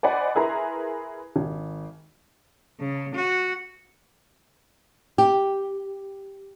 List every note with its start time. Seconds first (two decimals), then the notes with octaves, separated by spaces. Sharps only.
0.03 C5 D5 D#5 F#5 G#5 B5
0.35 E4 G#4 A#4 B4 A#5 C6
1.36 G#1
2.80 C#3
3.15 F#4
5.18 G4